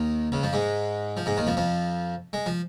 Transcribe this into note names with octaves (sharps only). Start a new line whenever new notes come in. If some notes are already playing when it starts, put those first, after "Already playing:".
Already playing: D#2 D#3
C#2 C#3
F2 F3
G#2 G#3
F3
G#2 G#3
D#2 D#3
F2 F3
F2 F3
G#3
F3